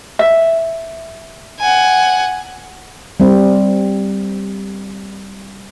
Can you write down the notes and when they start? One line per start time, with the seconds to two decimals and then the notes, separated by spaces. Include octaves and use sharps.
0.19 E5
1.60 F#5 G#5
3.20 G3 C4